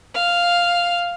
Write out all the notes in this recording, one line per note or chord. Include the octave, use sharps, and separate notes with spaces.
F5